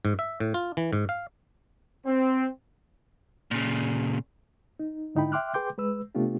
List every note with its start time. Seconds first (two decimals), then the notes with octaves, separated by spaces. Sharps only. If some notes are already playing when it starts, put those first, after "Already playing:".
0.05 G#2
0.19 E5
0.40 A2
0.54 F4
0.77 E3
0.93 G#2
1.09 F5
2.06 C4
3.51 A#2 C#3
4.79 D#4
5.15 G#2 D3 D#4 E4 G5 B5
5.32 E5 G5 C6 D6 F6 F#6
5.54 G#4 B4 G5 C6 D6 G6
5.78 G#3 B4 E6
6.15 C3 A3 B3 D4 F4 G4